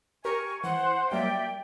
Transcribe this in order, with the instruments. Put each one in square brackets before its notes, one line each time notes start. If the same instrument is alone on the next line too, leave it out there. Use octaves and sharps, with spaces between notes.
[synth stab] G4 A#4 [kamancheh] G#5 [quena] C#6
[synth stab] E3 [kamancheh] C5 [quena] F#5
[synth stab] F#3 G3 A#3 [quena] D5 [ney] E5 [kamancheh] G5